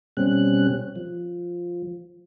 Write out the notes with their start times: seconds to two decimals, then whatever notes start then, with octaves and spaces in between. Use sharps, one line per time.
0.17 B2 G3 C4 C#4 F#6
0.96 F3